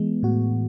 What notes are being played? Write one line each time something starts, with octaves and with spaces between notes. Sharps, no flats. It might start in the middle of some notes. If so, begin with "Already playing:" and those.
Already playing: E3 G#3 B3
A2 F#4